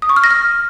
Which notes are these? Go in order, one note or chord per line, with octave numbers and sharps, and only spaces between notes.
D#6
C#6
F6
A#6
F6